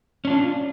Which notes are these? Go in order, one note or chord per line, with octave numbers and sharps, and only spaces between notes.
C#4 D4 F4